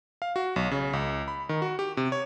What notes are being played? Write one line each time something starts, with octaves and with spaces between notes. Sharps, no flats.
F5
F#4
B1
C#3
C#2
B5
D#3
F#4
G4
C3
C#5